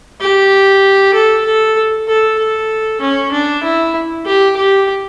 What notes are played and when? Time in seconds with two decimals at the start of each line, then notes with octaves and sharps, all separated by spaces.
0.21 G4
1.14 A4
1.45 A4
2.08 A4
2.39 A4
3.01 C#4
3.32 D4
3.63 E4
4.25 G4
4.57 G4